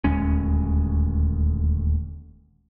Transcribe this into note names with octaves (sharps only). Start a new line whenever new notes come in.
D#1 D2 G#3 C#4